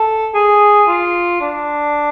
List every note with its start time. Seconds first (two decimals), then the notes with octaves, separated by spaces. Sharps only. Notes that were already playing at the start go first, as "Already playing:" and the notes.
Already playing: A4
0.34 G#4
0.88 F4
1.41 D4